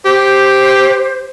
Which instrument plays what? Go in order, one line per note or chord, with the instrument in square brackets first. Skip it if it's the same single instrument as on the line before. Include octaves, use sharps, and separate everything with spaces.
[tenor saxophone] G4 [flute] C5